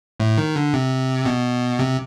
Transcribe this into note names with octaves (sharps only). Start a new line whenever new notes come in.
A2
D#3
D3
C3
B2
C3